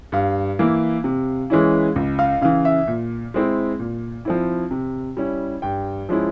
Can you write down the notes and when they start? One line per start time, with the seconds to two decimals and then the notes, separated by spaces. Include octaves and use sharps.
0.12 G2 F5
0.59 E3 A#3 E4
1.04 C3
1.50 E3 G#3 C#4 E4
1.96 C#2
2.19 F5
2.41 C#3 E3 F5
2.65 E5
2.87 A#2
3.34 G#3 C4 E4
3.79 A#2
4.25 F3 C4 E4
4.71 C3
5.17 G3 C#4 E4
5.62 G2 G5
6.09 F3 G#3 C#4 E4